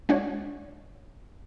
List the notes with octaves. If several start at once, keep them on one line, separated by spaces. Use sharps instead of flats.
G#3 D4 F#4 C#5